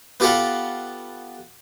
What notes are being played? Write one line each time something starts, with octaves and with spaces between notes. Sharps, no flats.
B3 F4 G4 A4 F5 F#5